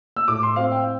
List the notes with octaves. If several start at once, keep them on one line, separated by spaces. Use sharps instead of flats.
E6
A2 D6
C6
C4 F5
G5